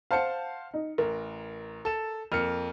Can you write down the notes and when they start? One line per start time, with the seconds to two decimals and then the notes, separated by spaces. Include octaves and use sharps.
0.11 C5 F5 F#5 A5 C#7
0.74 D#4
0.98 A1 A#4
1.85 A4 E7
2.32 F2 A#3 F6 C#7